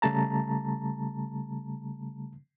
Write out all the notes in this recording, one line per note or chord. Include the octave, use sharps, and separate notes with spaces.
C#3 G3 A3 A5 A#5